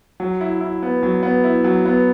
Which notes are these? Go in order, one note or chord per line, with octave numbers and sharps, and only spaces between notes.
F#3
E4
E4
B3
F#3
B3
E4
F#3
B3